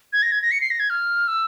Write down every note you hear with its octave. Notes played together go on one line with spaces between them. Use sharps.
G#6
A#6
G#6
A#6
C#7
C7
A#6
G#6
F6
E6